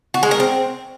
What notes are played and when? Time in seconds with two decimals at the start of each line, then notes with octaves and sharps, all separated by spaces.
0.14 F#4
0.23 G#3
0.31 A#4
0.40 C4